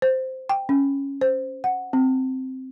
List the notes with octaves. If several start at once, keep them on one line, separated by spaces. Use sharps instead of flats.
C5
G5
C#4
C5
F#5
C4